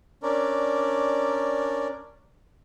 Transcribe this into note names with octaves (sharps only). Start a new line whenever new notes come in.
C#4 D4 A#4 D5